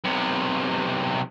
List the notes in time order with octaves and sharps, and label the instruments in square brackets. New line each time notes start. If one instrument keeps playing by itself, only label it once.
[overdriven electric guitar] B1 C3